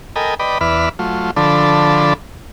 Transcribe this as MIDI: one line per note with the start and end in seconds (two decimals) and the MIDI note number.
0.16 0.34 69
0.16 0.34 70
0.16 0.34 75
0.16 0.34 79
0.16 0.34 80
0.16 0.34 83
0.39 0.58 71
0.39 0.58 74
0.39 0.58 75
0.39 0.58 79
0.39 0.58 83
0.61 0.89 40
0.61 0.89 71
0.61 0.89 74
0.61 0.89 76
0.61 0.89 83
0.61 0.89 89
0.99 1.31 54
0.99 1.31 57
0.99 1.31 65
1.36 2.13 50
1.36 2.13 53
1.36 2.13 62
1.36 2.13 69
1.36 2.13 83